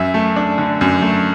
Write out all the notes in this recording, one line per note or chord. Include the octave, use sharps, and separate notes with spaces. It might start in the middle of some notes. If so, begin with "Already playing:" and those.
Already playing: F#2 E5
A3
D4
D3
F#2
A3